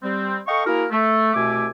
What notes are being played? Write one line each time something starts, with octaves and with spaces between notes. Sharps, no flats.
G3 C4
A4 D#5 F5 G5 C#6
A#3 E4 F#4 G#4 A#4
A3
C2 B2 A3 E5 G#5 D6